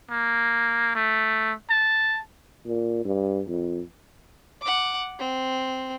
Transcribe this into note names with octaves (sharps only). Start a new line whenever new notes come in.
A#3
A3
A5
A#2
G2
F2
F#5 D6
C4